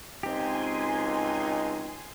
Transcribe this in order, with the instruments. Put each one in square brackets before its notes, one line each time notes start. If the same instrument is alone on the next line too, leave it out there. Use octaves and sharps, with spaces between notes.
[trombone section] C#2 D#4 [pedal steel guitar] C4 G4 [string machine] G#5 C6